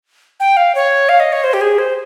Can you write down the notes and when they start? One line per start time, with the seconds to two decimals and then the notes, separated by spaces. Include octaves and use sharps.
0.40 G5
0.57 F5
0.75 C#5
1.09 F5
1.20 D#5
1.32 C#5
1.44 C5
1.53 G4
1.61 G#4
1.78 C5